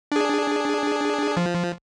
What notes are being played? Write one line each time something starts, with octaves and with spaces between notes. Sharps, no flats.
D4 G#4
F3